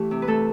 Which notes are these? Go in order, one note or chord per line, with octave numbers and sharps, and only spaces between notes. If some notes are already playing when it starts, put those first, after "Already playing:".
Already playing: E3 A3 G4
C3
B4
A3 A4